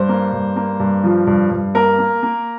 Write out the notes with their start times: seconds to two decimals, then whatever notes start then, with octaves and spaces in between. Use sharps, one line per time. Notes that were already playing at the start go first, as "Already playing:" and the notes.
Already playing: G2 C5
0.09 A#3
0.33 G2
0.56 A#3
0.80 G2
1.04 F3
1.27 G2
1.51 G2
1.74 A#3 A#4
1.99 A#3
2.23 A#3